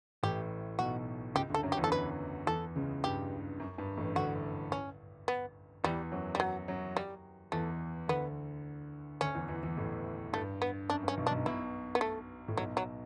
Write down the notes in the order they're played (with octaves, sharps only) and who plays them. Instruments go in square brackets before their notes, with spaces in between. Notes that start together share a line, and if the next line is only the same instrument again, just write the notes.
[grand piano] A1 A2 [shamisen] G4
[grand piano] B1 B2 [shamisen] F#4
[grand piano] C#2 C#3 [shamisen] G4
[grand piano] D2 D3
[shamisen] A4
[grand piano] F#2 F#3
[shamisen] G4
[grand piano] E2 E3
[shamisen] A4
B4
[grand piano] E2 E3 [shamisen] A4
[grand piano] C#2 C#3
[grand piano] G2 [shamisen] G4
[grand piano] F#2
G2
A1 A2
[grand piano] D2 D3 [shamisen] F#4
[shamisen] C#4
B3
[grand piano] E2 E3 [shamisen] G3
[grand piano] F#2 F#3
[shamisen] G3
F#3
[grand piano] F#2 F#3
[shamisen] G3
[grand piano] E2 E3 [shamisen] A3
[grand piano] D2 D3 [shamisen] B3
[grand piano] D2 D3 [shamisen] C#4
[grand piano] E2 E3
E2 E3
E2 E3
A1 A2
[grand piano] G2 [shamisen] A3
[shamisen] B3
[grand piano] F#2 [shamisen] D4
[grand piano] G2
[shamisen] C#4
[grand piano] B1 B2
[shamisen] D4
[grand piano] B1 B2
[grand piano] B1 B2 [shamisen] E4
[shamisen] B3
A3
[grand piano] A2
[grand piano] B1 B2 [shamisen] F#3
[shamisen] F#3